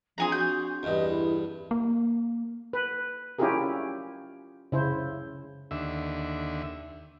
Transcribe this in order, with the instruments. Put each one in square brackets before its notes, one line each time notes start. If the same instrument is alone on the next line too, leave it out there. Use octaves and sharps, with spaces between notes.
[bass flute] F3 [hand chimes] C4 D4 C6 [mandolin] G#4 G#5 A#5
[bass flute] F#4 [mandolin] G6
[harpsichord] E2 G2 [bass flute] D#5
[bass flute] E4
[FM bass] A#3
[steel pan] B4
C#4 E4 F4 G4 G#4 A#4
C#3 E4 C5
[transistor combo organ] D#2 D3 E5